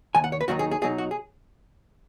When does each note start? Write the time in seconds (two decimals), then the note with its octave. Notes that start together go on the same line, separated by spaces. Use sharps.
0.15 D#2 D#3 G#5
0.24 F#5
0.32 C#5
0.41 B4
0.48 D#2 D#3 F#3 D#4 F#4
0.59 G#4
0.71 G#4
0.82 B2 F#3 D#4 G#4
0.98 F#4
1.11 G#4